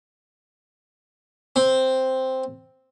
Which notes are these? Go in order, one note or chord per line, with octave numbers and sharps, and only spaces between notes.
C4